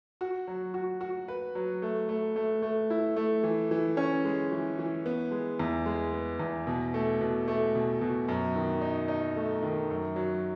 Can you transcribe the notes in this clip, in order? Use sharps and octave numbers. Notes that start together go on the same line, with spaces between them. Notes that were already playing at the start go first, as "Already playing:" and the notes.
F#4
F#3
F#4
F#4
B4
F#3
A3
A3
A3
A3
E4
A3
E3
E3
C#4
G#3
E3
E3
B3
G#3
E2
G#3
B3
E2
B2
A3
B2
A3
B2
B2
F#2
D#3
D#4
D#4
A3
D#3
F#2
F#3